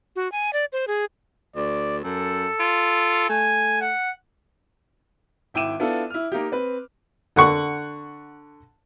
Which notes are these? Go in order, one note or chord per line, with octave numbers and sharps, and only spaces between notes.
F#4
G#5
D5
C5
G#4
D2 D5
F#2 A4
F4
A3 G#5
F#5
G#1 E4 G5 D6 D#7 E7
B3 D4 E4 F4 A4
E4 F6
A#3 D#4 G4
C4 B4
D3 F#5 C#6